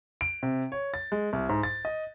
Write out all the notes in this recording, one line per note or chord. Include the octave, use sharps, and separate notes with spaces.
D7
C3
C#5
A6
G#3
C2
G#2
A6
D#5